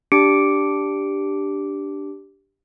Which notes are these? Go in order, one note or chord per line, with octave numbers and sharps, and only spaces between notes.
D4 G4 D6 C#7 D7